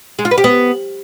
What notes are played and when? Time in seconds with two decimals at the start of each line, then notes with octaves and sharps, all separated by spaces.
0.19 G#3
0.25 F4
0.31 B4
0.38 G4
0.44 B3